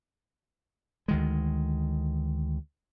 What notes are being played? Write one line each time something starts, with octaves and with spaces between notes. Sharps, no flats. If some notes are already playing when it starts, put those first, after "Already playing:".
D2 D#3 G#3